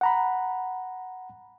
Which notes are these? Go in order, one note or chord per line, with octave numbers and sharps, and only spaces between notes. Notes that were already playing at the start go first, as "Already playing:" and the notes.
F#5 A#5 B5